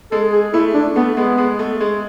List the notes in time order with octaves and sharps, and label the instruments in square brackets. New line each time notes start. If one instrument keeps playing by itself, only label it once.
[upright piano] G#3 [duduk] A4
[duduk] G#4
[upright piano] A3 [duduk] E4
[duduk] D4
[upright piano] A3 [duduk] B3
[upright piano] G#3 [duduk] B3
[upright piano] G#3
A3
G#3